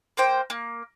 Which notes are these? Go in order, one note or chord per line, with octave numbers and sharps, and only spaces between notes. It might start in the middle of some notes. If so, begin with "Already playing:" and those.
A#3 C5 G5
A#3